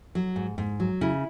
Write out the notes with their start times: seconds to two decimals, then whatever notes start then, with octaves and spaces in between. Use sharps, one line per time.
0.15 F#3
0.36 G#2
0.58 G#2
0.80 F#3
1.01 C#3 E4